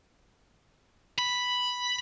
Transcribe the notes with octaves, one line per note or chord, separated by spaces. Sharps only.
B5